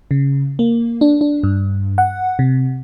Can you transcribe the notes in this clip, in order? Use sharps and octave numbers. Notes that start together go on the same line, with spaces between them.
C#3
A#3
D4
D4
G2
F#5
C3